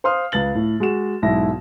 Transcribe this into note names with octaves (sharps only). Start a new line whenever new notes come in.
C5 F5 C6 D#6 F6
C#2 B4 A6 F#7
A2
G#3 F#4 G#4 E7
B1 G#2 E4 A#6